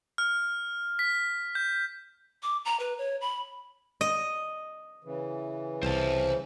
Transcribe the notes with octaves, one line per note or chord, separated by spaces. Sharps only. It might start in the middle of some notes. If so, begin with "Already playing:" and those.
F6
B6
G6
D6
A#5
B4
C#5
B5
D#5
C#3 E3
C2 C5 A5